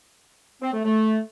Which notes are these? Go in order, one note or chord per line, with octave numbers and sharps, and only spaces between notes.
C4
A3
A3